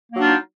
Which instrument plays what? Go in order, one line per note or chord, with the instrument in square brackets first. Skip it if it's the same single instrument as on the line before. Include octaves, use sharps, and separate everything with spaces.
[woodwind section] A#3
F#3
D4
F4
D#4